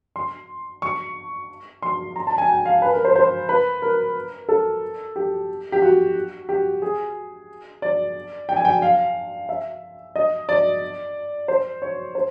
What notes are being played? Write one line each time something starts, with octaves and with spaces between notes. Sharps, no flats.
C6
C#6
C6
A#5
A5
G#5
G5
F5
B4
A#4
C5
C5
B4
A#4
A4
G4
G4
F#4
G4
G#4
D5
G5
G#5
G5
F5
E5
D#5
D5
C5
C#5
C5